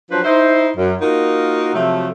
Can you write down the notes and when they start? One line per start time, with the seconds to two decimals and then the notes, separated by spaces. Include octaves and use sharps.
0.11 F3 F#3 D4 F4 B4 C5
0.24 D#4 E4 C5
0.77 F#2
1.00 A#3 D#4 F4 F#4 A#4
1.74 C3 F3 F#3 A3